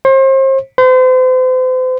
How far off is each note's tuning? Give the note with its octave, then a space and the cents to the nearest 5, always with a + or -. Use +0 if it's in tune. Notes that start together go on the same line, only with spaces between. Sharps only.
C5 +35
C5 -40